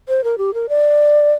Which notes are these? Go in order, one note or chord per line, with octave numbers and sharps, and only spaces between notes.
C5
A#4
G4
A#4
D5